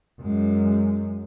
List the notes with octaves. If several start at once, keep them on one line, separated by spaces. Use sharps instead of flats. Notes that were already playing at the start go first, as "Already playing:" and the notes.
F#2 G#3